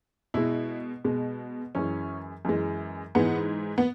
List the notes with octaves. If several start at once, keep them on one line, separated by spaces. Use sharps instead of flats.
B2 G#3 E4
B2 G#3
F#2 E3 G#3 C#4
F#2 E3 G#3
G#2 E3 G#3 B3
B3